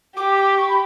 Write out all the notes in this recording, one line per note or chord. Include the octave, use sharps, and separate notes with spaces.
G4 D6
D6
C#6
B5